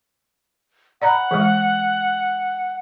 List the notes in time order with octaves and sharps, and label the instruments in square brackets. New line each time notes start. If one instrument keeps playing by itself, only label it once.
[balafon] D5 A#5 B5 [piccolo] F#5
[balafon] E3 G#3